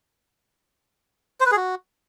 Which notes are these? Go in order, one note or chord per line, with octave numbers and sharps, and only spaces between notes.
C5
B4
G#4
F#4